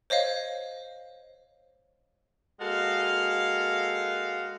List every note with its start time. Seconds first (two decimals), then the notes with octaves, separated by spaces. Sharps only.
0.10 C5 C#5 D#5 F5
2.60 G#3 A#3 F#4 A4 F5